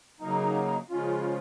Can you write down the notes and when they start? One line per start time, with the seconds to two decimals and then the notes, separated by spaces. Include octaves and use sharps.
0.20 C#3 F#3 A#3 D#4
0.90 C#3 F3 G#3 C#4 F4